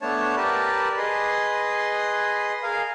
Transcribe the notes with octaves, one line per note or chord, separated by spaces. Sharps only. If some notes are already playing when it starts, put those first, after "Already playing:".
A3 B3 D4 C#5 A5
G4 A#4 B4 D5 A5
G#4 B4 D#5 C6
G#4 A#4 F5